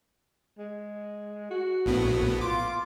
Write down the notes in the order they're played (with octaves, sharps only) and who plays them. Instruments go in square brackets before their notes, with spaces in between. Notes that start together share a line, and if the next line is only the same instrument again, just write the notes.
[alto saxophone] G#3
F#4
[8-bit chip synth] A#1 A2 B3
[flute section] F4 C6 [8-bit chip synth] D6